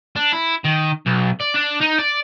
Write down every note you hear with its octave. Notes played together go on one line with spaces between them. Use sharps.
D4
E4
D#3
B1
D5
D4
D#4
D5